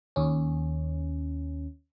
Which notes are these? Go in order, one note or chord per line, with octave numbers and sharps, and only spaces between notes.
D#2 C#4